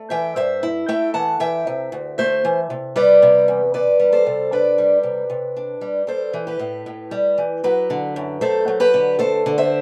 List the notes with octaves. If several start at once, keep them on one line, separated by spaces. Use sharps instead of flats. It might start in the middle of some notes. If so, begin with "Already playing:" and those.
Already playing: A3
E3 E5 G5
G2 C5 E5
E4
A3 E5 G5
E3 F#5 A5
E3 E5 G5
C3
D2
A3 C5 E5
E3
C3
G3 B4 D5
C3
E2
E2 B4 D5
G3
A4 C5
C3
D4 B4 D5
G3
C3
C3
D4
G3
G3 A4 C5
E3
G4 B4
A2
A2
G3
E3
F#3 G4 B4
D3
F#2
A3 A4 C5
F#3
G4 B4
D3
A3 A4 C5
D3
C5 E5